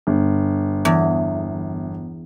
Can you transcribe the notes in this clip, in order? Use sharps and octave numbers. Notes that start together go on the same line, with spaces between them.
G1
E2